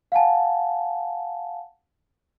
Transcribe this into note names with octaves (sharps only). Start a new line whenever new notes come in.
F5 F#5 G#5 A5